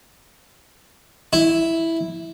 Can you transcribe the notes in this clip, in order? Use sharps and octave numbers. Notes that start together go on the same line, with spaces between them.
E4